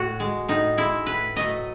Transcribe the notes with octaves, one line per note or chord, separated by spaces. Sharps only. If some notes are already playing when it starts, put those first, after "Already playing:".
Already playing: A2 F#4
G#3
A2 D#4
G#3 E4
A2 B4
F#3 A3 D#5